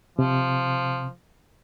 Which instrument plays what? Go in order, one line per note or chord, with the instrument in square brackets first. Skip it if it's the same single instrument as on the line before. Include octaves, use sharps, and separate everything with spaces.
[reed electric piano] C3 [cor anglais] F3